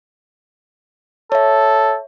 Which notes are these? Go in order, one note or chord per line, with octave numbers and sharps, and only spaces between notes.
A4 C#5 E5